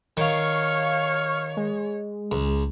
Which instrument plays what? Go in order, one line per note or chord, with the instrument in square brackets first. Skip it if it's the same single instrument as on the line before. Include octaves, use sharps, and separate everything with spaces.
[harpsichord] D#3 [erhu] C#5 [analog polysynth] F5 C#6
[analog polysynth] G#3
[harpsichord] C#2